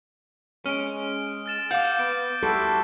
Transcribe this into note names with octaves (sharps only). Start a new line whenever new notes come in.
G#3 C#4 F6 D7
F6 A6 E7
F5 F#5 D6 G6
B3 D6 D7
G3 E4 F#4 A4 C6